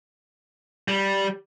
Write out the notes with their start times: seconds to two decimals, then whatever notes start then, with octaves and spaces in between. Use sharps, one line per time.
0.88 G3